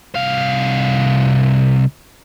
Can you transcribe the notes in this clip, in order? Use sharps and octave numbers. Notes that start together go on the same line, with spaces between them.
C2 F5